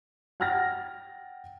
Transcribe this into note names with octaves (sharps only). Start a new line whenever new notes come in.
F#5 G5 F6 A6 A#6